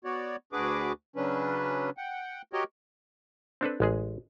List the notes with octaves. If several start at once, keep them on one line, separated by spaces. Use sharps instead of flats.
B3 F#4 C#5 D5
D2 D4 F#4 G#4 B4 D6
C#3 F#3 C#4 D4 B4
F#5 G5
F#4 G4 A#4 C#5 D#5 G5
C4 D4 A4 B4
A1 G#3 G#4